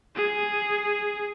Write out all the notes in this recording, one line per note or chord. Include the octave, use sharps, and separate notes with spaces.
G#4